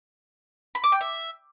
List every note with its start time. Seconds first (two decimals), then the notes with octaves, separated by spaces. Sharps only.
0.75 B5
0.84 D6
0.92 G5
1.01 E5